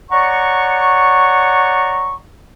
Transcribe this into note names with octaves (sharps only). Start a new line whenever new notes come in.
C#5 D5 F#5 A#5 C#6